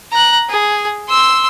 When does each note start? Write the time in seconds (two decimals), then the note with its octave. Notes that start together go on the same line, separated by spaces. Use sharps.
0.12 A#5 F#6
0.50 G#4
1.09 C6 E6